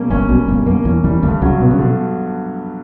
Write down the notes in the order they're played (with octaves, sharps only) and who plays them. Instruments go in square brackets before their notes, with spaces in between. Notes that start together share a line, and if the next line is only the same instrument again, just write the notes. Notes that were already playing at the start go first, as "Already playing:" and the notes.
Already playing: [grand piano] B2 G3 A#3 C#4
[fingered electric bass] G1 G2 [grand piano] C#4
[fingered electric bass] B1 B2 [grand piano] G3
[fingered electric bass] G1 G2 [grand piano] B2
[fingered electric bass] F#2 [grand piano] A#3
[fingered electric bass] E2 E3 [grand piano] C#4
[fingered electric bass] E2 E3 [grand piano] G3
[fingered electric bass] D2 D3 [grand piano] G2
[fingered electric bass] C#2 C#3 [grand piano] F#3
[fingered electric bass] B2 [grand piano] B3
[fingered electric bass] C#3
[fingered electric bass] B2 [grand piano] D3